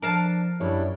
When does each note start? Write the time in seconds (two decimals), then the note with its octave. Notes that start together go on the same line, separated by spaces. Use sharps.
0.02 F3 D4 A#4 F5 A5
0.60 F#2 G3 D4 E4 C#5